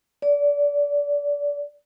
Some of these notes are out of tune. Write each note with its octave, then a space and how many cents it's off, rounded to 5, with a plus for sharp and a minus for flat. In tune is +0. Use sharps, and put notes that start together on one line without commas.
D5 -25